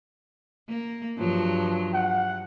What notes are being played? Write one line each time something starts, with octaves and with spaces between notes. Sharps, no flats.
A#3
G2 F3 F#3
F#5